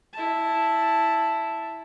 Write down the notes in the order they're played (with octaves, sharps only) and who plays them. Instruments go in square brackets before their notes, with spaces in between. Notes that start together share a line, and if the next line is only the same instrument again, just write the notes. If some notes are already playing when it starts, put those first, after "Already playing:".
[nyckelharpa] E4 A5